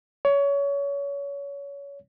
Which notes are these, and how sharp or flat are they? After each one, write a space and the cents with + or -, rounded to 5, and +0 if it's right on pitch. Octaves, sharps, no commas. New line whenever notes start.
C#5 +25